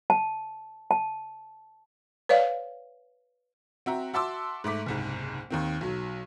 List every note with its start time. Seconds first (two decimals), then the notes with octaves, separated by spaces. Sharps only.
0.10 A5
0.91 A5
2.29 B4 C#5 D5 F5
3.86 C4 F#4 E5 A#5
4.13 F#4 E5 A5 C6 D6 E6
4.64 G#2 A3 D6 B6
4.86 F#1 C2 G#2
5.51 D#2 D#3 C4
5.81 B1 F#3